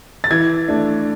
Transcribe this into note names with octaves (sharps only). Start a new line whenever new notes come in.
A6
E3 G#6
A3 D4